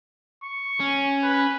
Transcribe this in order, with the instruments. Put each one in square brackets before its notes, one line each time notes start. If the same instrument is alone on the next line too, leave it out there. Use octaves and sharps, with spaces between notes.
[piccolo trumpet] C#6
[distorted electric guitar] C#4
[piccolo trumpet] B4